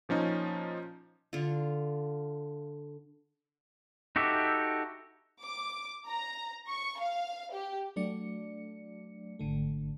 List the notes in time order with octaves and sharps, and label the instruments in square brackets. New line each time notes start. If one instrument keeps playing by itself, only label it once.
[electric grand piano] A#2 F3 C#4 D#4
[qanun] D3 F4
[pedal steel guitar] D#4 F#4 G4 A4 E5
[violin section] D6
A#5
C#6
F5
G4
[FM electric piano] F#3 A3 D4 D5 C#7
G#1 D3 A3